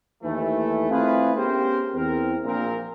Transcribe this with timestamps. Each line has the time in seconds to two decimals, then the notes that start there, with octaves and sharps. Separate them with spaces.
0.23 D#2 E3 A3
0.90 A3 C4 E4 F4 G#4 B4
1.36 B3 C#4 G4 G#4 A#4 C5
1.95 E2 C4 A#4
2.45 A#1 A#2 C4 A#4